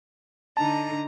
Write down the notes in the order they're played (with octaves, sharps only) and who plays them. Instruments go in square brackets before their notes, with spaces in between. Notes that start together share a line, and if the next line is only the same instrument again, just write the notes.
[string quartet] D3 D#4 A#5 [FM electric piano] A5